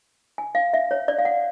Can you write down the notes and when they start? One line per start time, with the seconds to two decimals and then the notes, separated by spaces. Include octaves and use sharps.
0.38 G#5
0.55 F5
0.73 E5
0.91 C#5
1.08 D5
1.18 F5
1.25 F#5